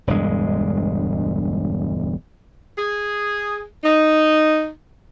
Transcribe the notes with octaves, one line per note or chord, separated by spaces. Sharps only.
E1 D2 G2 G#3
G#4
D#4